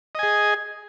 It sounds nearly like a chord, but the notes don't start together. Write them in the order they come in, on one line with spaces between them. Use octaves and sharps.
D#5 G#5 G#4